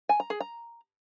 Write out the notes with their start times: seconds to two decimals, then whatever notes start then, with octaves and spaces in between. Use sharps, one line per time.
0.09 G#5
0.20 A#5
0.30 G#4
0.40 A#5